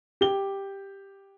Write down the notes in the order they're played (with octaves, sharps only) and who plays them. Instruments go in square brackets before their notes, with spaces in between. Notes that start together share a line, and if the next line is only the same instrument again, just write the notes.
[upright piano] G4 G7